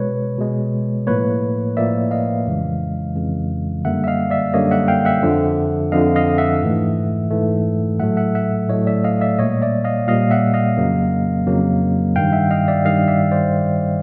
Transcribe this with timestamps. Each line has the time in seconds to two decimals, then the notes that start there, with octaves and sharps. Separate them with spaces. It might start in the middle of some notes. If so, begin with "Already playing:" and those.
Already playing: B2 G#3 B4 C#5
0.38 B2 G#3
1.07 A2 F3 A#3 B4 C#5
1.77 A2 F3 A#3 D5 E5
2.11 D#5 F5
2.46 F2 C#3 E3 G#3
3.15 F2 C#3 E3 G#3
3.84 F#2 D3 G3 A#3 E5 F#5
4.04 E5
4.07 D#5 F5
4.30 D5 E5
4.54 F#2 D3 G3 A#3 C#5 D#5
4.71 E5 F#5
4.88 F5 G5
5.05 E5 F#5
5.23 F2 D3 F3
5.92 F2 D3 F3 D#5 F5
6.16 D#5 F5
6.38 E5 F#5
6.62 G#2 E3 A3
7.30 G#2 E3 A3
8.00 A2 F#3 A3 E5 F#5
8.17 E5 F#5
8.35 E5 F#5
8.69 A2 F#3 A3 C#5 D#5
8.87 D5 E5
9.04 D#5 F5
9.21 D5 E5
9.39 A#2 G3 A#3 C#5 D#5
9.62 D5 E5
9.85 D#5 F5
10.08 A#2 G3 A#3 D#5 F5
10.31 E5 F#5
10.54 D#5 F5
10.77 F2 C#3 F#3 A#3
11.47 F2 C#3 F#3 A#3
12.16 G2 D#3 G3 F5 G5
12.33 E5 F#5
12.51 D#5 F5
12.68 D5 E5
12.85 G2 D#3 G3 D#5 F5
13.08 D5 E5
13.31 C5 D5